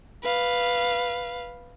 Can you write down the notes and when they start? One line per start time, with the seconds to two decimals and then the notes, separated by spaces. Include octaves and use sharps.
0.23 B4 F5